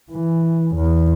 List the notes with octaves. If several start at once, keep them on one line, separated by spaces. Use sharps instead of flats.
E3
E2